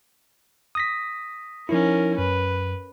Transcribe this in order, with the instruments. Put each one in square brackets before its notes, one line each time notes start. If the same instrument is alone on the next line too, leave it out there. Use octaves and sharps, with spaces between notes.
[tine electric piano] D#6 A#6 B6
[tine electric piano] F3 D#4 E4 [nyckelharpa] C#4 A#4
[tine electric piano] F#2 [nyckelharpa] B4